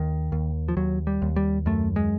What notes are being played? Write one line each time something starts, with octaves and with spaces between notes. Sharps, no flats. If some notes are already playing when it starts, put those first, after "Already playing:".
Already playing: D#2 D#3
D#2
F3
D#2 F#3
G3
D#2
G3
F#2 A3
G#3